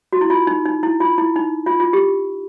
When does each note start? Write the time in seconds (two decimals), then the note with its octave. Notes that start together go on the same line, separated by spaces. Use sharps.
0.12 F#4
0.21 E4
0.30 F4
0.47 D#4
0.65 D#4
0.83 E4
1.00 F4
1.18 E4
1.36 D#4
1.66 F4
1.80 F4
1.93 G4